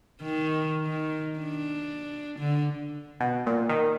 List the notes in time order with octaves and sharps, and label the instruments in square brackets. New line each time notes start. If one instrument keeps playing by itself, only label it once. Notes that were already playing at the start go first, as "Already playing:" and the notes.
[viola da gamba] D#3
D#3
D4
D3
[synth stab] B2
A#2
D#3